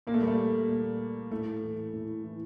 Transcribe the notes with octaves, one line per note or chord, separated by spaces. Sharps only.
A#2 A#3
A3
G3
A3
A#2
A2 A3
E3
A2
E3